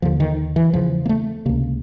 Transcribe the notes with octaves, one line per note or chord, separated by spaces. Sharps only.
D#2 D3 F3
D#3
E3
E2 C#3 F3
A#3
A3
C#2 C3 A#3